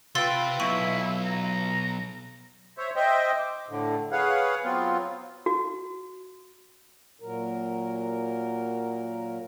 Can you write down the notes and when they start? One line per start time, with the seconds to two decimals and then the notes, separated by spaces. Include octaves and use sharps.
0.15 C3 F4 B4 G5 C6 E6 A6
0.60 B1 E4 B5 C#6 D#7
1.25 A#5
2.78 C5 C#5 E5
2.96 C5 D#5 E5 G5
3.38 D6
3.69 A2 D3
4.12 G#4 B4 C#5 F5 F#5
4.64 F#3 B3 C4 F4
5.46 F#4
7.20 A#2 F#3 A#4